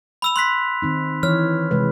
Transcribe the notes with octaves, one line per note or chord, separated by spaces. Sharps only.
B5 E6 F7
C6 F#6 B6
D#3 C4 D#4
E3 C#5 F6
C3 G#3 B4